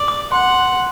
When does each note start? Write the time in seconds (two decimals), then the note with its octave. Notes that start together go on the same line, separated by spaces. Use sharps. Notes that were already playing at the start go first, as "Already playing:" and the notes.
Already playing: D5
0.08 D6
0.32 F#5 C6